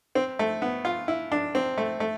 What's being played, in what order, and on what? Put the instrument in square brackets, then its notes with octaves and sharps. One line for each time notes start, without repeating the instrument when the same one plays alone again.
[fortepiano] C4
A3
B3
F4
E4
D4
C4
A3
A3